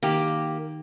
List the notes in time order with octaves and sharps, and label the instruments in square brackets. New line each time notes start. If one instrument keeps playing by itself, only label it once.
[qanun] D#3 D6 [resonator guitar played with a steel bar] A#3 G4